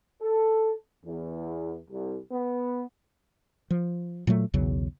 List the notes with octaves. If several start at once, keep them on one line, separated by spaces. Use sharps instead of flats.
A4
E2
C2
B3
F3
A#2 F#3 A3
B1 E2 C#3 F#3